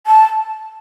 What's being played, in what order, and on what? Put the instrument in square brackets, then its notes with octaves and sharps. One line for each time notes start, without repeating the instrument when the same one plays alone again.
[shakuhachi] A5